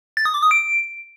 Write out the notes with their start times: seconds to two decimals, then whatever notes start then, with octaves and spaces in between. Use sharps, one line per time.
0.17 A6
0.25 D#6
0.34 D6
0.43 D#6
0.51 D7